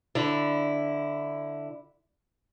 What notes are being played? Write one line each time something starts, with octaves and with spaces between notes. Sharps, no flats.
D3 E4